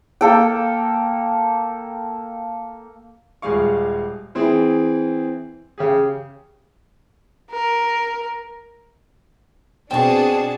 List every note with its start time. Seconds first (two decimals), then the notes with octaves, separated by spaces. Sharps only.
0.21 A#3 A4 G5
3.42 D#1 G3 G#3 G#4 F5 C#6
4.35 E3 C4 E4 G#4
5.78 C#3 G4 G#4
7.51 A#4
9.91 B2 C4 D4 F#4 G#4 G5 A5 C#6